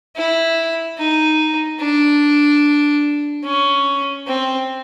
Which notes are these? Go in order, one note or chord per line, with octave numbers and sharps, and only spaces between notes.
E4
D#4
D4
C#4
C4